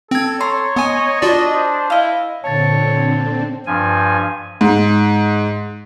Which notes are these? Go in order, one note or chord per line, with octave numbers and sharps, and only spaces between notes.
C4 A4 G#6
C#5 A#5 C6
B3 D#5 G#5
D4 F4 F#4 D5
C5
E4 D#5 F5
A#2 D3 C4 C#5 A5 A6
G2 F3 G#5
G#2